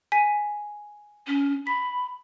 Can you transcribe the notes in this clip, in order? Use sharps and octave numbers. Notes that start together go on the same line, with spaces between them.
G#5 B6 D#7
C#4
B5 B6